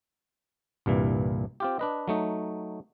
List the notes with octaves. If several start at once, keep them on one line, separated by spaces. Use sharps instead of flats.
C2 G2 A#2 E3
C4 F4 G4
D4 B4 D#5
F#3 A3 D#4